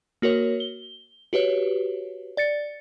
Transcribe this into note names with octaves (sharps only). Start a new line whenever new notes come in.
A#3 F#4 A#4 C#5
G7
F#4 G4 B4 C#5
D5 A6 C#7